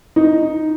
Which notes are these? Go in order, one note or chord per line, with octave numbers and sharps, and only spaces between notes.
D#4